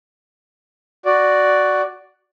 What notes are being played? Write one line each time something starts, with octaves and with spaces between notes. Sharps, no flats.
F#4 D5